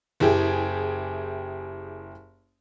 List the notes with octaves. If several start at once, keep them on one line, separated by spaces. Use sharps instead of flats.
F#1 E4 G4 G#4